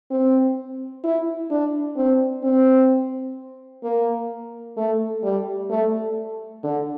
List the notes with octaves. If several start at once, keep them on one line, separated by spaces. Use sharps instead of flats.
C4
E4
D4
C4
C4
A#3
A3
G3
A3
D3